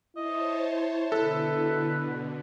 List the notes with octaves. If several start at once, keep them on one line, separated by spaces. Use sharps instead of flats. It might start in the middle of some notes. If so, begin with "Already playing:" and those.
E4 C5 C#5 D#5 A5
B2 D3 A4 B4